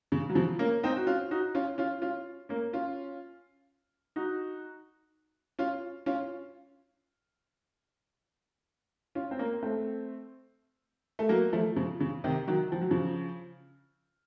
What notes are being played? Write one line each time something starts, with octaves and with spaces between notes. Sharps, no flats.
C#3
F#3
C#3 F3
A#3 C#4
C4 D#4
F#4
C#4 F4
D#4 F#4
C#4 F4
C#4 F4
C#4 F4
A#3 C#4
C#4 F4
D#4 F#4
C#4 F4
C#4 F4
C#4 F4
C4
A#3 C#4
A3 C4
A3
F#3 A#3
F3 A3
C#3 F3
C#3
C3 D#3
D#3 F#3
F3
F#3
C#3 F3